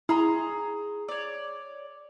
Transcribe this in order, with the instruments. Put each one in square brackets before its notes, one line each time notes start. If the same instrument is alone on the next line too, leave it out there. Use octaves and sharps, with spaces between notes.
[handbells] E4 [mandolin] G#4 A#5 C6
[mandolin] C#5 D5